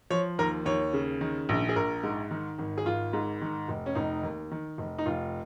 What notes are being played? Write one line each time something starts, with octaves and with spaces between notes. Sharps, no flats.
F3 C#5
D#2 A#4
D#2 C#5
C#3
D#3
A#1
G#4
A#1 A#4
G#2
D#3
G#1
G#4
G#1 F4
G#2
D#3
F1
C#4
F1 D#4
D#2
D#3
F1
D#4
F1 F4